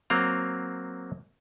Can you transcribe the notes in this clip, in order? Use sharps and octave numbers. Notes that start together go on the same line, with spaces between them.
F#3 A#3 C4 A#5